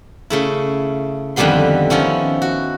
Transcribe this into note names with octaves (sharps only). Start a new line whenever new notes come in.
C#3 A3 E4
F2 D3 D#3 G3 B3 C6
D#3 F3 C#4 E4
F#4